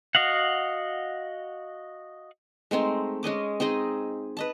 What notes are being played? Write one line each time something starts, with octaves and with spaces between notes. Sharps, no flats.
F#4 D#5 F5 F#5
G#3 A3 C4 D#4
G#3 C#4 D#5 D6
C4 D#4 G#4 D#5
B4 D#5 A5